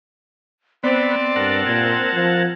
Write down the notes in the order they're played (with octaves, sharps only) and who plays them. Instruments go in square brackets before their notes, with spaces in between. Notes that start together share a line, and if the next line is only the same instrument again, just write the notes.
[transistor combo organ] B3 [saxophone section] C4 [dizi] D5
[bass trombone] G2 [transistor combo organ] A#4 F#5 A5
[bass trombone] A#2 [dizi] G#6
[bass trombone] F3